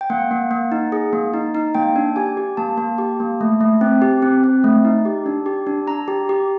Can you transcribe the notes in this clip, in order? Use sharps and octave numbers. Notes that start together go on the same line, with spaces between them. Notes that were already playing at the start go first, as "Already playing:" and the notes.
G5
A#3 F#5
A#3
A#3
D#4
G#4
A#3
D#4
D#4
A#3 G5
D4
G4 G#5
G4
A#3 A5
A#3
G4
A#3
A3
A3
C4
G4
C4
C4
A3
D#4
G4
D4
G4
D4
D4 A#5
G4
G4